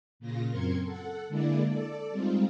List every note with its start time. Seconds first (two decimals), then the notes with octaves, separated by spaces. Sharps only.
0.19 A#2 C#3 F4 A#6
0.50 F#2 C4 A#4 C6 G#6 C#7
0.83 A4 F#5
1.28 D3 G#3 A#3 E4 D5
1.69 A4 D5
2.11 G3 G#3 C4 D#4 F4